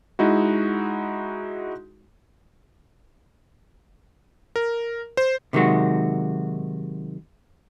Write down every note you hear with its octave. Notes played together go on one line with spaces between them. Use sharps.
G#3 D#4 E4 F#4
A#4
C5
C3 D#3 F#3 G#3 F#4